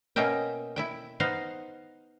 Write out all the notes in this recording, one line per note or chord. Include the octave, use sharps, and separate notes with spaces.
B2 A#3 C#4 D#5 E5 G5
E4 E5 G5
B3 D#4 C5 D#5 F5